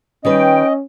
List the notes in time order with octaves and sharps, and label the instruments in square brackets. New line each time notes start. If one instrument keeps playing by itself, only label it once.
[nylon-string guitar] D#3 G3 B4 [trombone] C#4 [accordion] D#5 [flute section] G5